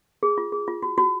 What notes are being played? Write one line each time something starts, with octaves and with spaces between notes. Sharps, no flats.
G#4
F4
G#4
F4
F#4
F#4